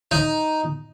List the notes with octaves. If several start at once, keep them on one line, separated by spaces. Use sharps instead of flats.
D#4